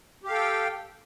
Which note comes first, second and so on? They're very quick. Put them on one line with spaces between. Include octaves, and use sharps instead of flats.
G4 F5 A4 G5